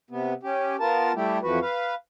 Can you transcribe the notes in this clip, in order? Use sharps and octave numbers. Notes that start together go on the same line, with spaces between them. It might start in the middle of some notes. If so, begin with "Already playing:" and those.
C3 B3
C#4 G4
B3 F4 A#4 A5
G3 A3 E4 G4
F2 E3 F3 F#4 B4
B4 F5